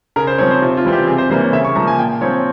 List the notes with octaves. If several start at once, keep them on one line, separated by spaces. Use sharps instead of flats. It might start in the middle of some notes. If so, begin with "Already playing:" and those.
C#3 A#4
C5
F3 C4 C#5
C5
C3 F4
F4
E3 G3 C4
G4
C3 G#4
C5
E3 G3 A#3 C5
C#5
C#3 E5
C#6
F3 A#3 A#5
G#5
A#2 G5
F3 C4 C#5